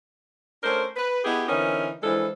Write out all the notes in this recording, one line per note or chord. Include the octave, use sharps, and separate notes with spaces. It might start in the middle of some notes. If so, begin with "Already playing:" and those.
A3 C#4 D4 A#4 C5
B4
B3 D#4 E4 G4 G#4
D3 E3 C4 C#4 D#4 A#4
E3 F3 G#3 D4 E4 A4